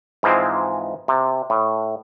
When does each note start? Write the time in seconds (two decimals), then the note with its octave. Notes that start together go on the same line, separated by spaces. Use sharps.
0.23 G#2 E3 F3 G#3 C4
1.08 C3
1.50 A2